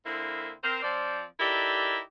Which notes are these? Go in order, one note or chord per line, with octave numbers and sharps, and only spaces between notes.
D3 A#3 C4 E4
C4 A#4 C5
F3 C4 D5
D#4 E4 G4 A4 A#4 D5